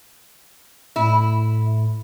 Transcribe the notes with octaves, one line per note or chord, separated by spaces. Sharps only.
A2 E4